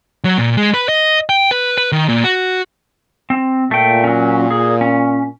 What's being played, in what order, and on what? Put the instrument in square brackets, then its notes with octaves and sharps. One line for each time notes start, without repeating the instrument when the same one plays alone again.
[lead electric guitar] F#3
A#2
G#3
B4
D#5
G5
B4
B4
D#3
A#2
F#4
[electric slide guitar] C4
[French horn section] A#2 [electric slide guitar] A3 G5
[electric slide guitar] F#3 C#4
G#4
C#4